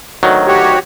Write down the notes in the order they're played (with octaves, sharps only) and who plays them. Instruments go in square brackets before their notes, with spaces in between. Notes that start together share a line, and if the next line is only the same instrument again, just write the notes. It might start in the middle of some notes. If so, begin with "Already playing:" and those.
[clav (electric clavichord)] D2 D#3 F#3
[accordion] F#4 G4 C#5